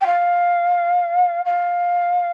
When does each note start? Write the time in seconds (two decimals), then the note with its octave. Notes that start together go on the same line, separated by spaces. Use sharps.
0.01 G5
0.06 F5
1.45 F5